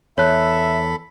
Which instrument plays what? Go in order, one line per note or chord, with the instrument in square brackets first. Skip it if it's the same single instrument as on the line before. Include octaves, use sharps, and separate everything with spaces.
[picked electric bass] E2 [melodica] A4 B5 [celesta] C#5 F#6 [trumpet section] E5